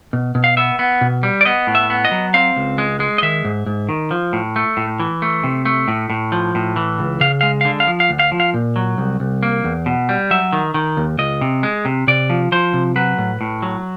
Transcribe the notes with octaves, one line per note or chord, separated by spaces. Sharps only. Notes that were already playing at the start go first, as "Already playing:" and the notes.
B2
B2
F5
B3 E5
B3
B2
G3
D5
B3 D#5
A2
E5
B3
D#5
F#3
C4 F5
C#2
G#3
G#3
D#5
D#3 E5
G#2
G#2
D#3
F3
A2
A3
A2
E3
A3
C3
A3
A2
A2
F3
A2
E3
C#2
C#3 F5
G#3 F5
D3 F5
F5
F3
F5
D2
F5
F3
F5
A#2
F#3
C2
C2
A#3
E2
B2
G3
F#3 E5
D#3
D#3
D#2
C#2 D#5
C3
G#3
C3
C3 D5
F3
F3 C5
C3
F#3 B4
A2
A2
F#3